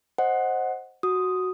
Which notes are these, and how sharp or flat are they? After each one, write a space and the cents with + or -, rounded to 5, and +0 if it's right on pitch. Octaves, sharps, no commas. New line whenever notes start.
C5 +5 D#5 +0 F#5 +0
F#4 +0 D#6 +0